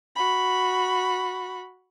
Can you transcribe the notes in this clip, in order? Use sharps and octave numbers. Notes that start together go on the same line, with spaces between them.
F#4 B5